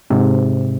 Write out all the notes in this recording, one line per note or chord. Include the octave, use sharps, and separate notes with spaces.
G#2 C3